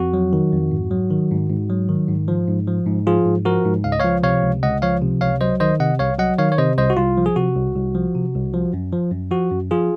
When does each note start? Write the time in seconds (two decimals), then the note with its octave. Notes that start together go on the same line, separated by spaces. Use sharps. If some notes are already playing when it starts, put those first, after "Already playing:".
Already playing: F2 F#4
0.14 F#3
0.33 D#3
0.52 F2
0.71 G#2
0.91 F#3
1.11 D#3
1.31 G#2
1.50 G#2
1.70 F#3
1.89 D#3
2.09 G#2
2.28 F3
2.48 G#2
2.68 F3
2.87 G#2
3.07 F3 F4 G#4
3.26 G#2
3.45 F3 F#4 A#4
3.65 G#2
3.84 C#2 F5
3.92 D#5
4.00 F3 C#5 F5
4.23 C3 C#5 F5
4.43 C#2
4.62 C#2 D#5 F#5
4.82 F3 C#5 F5
5.02 C3
5.21 C#2 C#5 F5
5.41 F#3 C5 D#5
5.60 D#3 C5 D#5
5.80 C3 D#5 F#5
5.99 C2 C#5 F5
6.19 F#3 D#5 F#5
6.38 D#3 C#5 F5
6.52 C#5
6.58 C3 C5 D#5
6.77 C2 C5 D#5
6.90 F#4
6.97 C2 F4
7.17 F3
7.26 G#4
7.36 C3 F#4
7.55 C2
7.75 C2
7.95 F3
8.15 C3
8.34 C2
8.54 F3
8.73 F#2
8.92 F3
9.12 F#2
9.31 F3 F#4
9.51 F#2
9.71 F3 F4 G#4